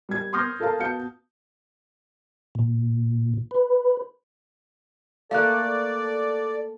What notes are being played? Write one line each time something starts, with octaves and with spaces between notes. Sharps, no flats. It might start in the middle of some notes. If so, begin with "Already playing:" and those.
G3 G#6
C6 C#6 D#6 F6 G6 A#6
F4 A4 A#4 F5 A5
B3 F#4 F5 A5 G6 C#7
A#2
B4
A3 A#3 A4 A#4 D5 F5 F#6